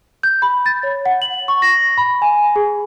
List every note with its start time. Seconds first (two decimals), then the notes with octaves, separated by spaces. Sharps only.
0.23 G6
0.42 B5
0.66 A6
0.83 C#5
1.06 F#5
1.22 F#7
1.48 C#6
1.62 A#6
1.98 B5
2.22 G#5
2.56 G#4